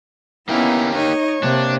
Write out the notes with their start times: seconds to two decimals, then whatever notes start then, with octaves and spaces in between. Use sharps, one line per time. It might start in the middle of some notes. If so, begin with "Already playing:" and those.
0.49 A#3 B3 C#4 D#4 E4 G4 A#4
0.94 D#4 C#5 D#5
1.43 C3 A#3 D4